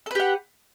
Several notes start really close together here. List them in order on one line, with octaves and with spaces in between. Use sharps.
A4 B4 G4 F#5